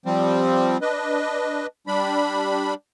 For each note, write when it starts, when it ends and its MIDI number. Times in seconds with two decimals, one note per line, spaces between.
0.06 0.77 53
0.06 0.77 55
0.06 0.77 60
0.81 1.66 62
0.81 1.66 71
0.81 1.66 75
1.87 2.74 55
1.87 2.74 62
1.87 2.74 83